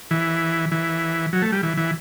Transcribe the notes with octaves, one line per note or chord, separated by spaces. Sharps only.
E3
E3
F#3
A3
G3
E3
E3